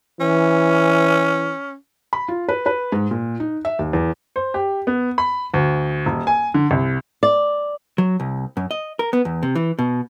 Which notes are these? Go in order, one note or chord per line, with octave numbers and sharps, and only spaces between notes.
E3 C#4
B5
F4
B4
B4
G#2
A#2
D#4
E5
D#2
E2
C5
G4
B3
B5
D2
D#1
G#5
D3
C2
D5
F#3
C2
F#2
D#5
A#4
B3
E2
C3
E3
B2